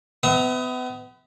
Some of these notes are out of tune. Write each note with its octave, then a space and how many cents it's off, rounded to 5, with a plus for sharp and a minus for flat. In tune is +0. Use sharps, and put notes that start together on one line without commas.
B3 +35 E5 -20 A#5 +0